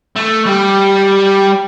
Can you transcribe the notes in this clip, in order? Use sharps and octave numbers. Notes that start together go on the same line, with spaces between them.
A3
G3